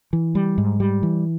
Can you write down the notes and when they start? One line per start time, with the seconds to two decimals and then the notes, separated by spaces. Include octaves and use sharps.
0.13 E3
0.35 G3
0.58 G#2
0.80 G3
1.03 E3